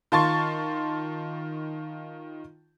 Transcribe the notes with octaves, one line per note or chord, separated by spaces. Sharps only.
D#3 F4 A5 C6 C#6 A6